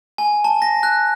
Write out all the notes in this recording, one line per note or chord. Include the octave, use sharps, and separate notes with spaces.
G#5
A5
A#6
F#6